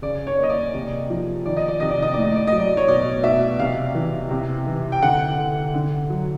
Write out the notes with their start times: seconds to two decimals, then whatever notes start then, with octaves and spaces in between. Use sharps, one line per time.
0.02 C#3 D5
0.27 C#5
0.38 A#3 D#5
0.50 D5
0.74 C3
1.10 F3
1.45 D#3 D5
1.57 D#5
1.68 D5
1.80 C3 D#5
1.91 D5
2.02 D#5
2.14 A2 D5
2.25 D#5
2.36 D5
2.47 F#3 D#5
2.60 D5
2.77 C#5
2.88 B2 D5
3.23 B2 E5
3.59 C3 F5
3.95 E3
4.31 C3
4.67 E3
4.92 G5
5.02 D3 F#5
5.38 D3
5.74 D3
6.10 F#3